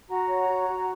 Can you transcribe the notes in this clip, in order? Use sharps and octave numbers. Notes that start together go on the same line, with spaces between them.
F#4 F#5 A#5
C#5
F#4
F#4